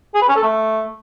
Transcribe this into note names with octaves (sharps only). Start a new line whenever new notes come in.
G#4
B4
C#4
A4
A3